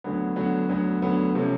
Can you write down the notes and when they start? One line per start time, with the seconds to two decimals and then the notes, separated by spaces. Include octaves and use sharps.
0.04 D2 D3 F#3 B3
0.36 D2 D3 F#3 B3
0.69 D2 D3 F#3 B3
1.02 D2 D3 F#3 B3
1.35 C3 F3 A3 C#4